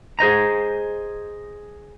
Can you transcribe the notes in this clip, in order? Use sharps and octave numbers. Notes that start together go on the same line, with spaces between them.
G#4 C5 D#5 A#5